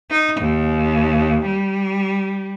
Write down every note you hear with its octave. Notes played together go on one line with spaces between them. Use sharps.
D#4
D#2
G3